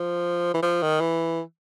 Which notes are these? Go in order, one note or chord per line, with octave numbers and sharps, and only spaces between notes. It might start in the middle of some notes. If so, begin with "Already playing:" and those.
Already playing: F3
E3
F3
D#3
E3